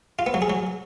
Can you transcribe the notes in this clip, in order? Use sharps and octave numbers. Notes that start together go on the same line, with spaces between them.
F4
B3
F#3
G#4
F#3